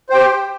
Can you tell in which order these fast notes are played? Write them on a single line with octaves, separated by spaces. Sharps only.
C5 G5 G4